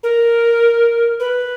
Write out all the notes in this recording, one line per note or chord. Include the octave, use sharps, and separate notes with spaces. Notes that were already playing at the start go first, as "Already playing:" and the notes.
A#4
B4